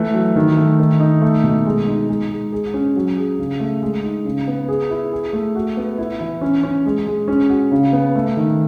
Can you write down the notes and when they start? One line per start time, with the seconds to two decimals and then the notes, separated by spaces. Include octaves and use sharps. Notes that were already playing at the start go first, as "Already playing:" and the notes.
Already playing: E3 A3
0.14 F#3
0.36 D#3
0.57 A3
0.80 D#3
1.00 D#4
1.22 A3
1.44 B2
1.66 G#3
1.88 D#4
2.09 G#3
2.30 G#3
2.53 G#4
2.74 C#4
2.96 F#3
3.18 G#4
3.39 C#3
3.60 A3
3.82 G#3
4.03 D#4
4.25 C#3
4.48 B3
4.68 G#4
4.90 E4
5.12 G#4
5.33 A3
5.56 F#4
5.77 B3
5.98 E4
6.21 E3
6.41 C#4
6.63 C#4
6.86 G#3
7.07 G#3
7.28 C#4
7.50 F#4
7.72 C#3
7.93 B3
8.15 A3
8.37 D#3